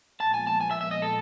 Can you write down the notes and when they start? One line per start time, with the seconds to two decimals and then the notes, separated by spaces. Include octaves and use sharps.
0.20 A#2 F3 G#3 B3 A5
0.34 G#5
0.47 A5
0.61 G#5
0.71 E5
0.81 E5
0.91 D#5
1.02 A4